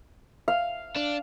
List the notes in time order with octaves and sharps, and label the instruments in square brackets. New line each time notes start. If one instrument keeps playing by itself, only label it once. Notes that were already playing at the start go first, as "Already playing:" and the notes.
[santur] F5
[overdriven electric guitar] D4